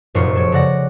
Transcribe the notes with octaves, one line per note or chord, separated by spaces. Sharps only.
F1 F#2 A#2 F4 C5 C#6
A4 C#5 D7
C#3 G#3 D5 F#5 A#6